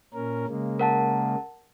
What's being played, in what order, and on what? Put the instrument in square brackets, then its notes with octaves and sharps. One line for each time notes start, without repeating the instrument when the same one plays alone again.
[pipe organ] A#2 C#4 A#4
C#3 G#3 A#3
[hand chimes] A#4 F#5 A5